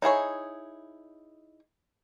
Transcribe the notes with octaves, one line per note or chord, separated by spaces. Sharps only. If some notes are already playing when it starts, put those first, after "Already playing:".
D#4 E4 G#4 C#5